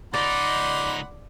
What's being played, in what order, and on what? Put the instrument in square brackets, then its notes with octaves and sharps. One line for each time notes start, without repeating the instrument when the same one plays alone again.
[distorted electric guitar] C#2 D#4 [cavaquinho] D5 [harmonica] F#5 B5 C6